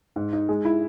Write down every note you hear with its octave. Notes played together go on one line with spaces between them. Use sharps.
G#2
D#4
G#3
E4